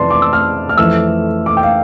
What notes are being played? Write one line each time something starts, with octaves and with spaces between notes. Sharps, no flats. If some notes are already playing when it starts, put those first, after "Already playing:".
Already playing: F2 C3 E3 B4 D5 A5 C6
D6
E6
F6
F6
F2 E3 A3 E6
D6
G5
F5